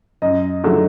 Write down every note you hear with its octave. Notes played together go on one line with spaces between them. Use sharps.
F#2 D#5
D3 F#3 A3